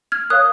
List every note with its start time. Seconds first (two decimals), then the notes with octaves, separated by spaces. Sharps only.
0.12 F6 G#6
0.30 A#4 C#5 F5 D#6 F#6